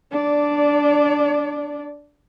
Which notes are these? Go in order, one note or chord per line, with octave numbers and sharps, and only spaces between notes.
D4 D5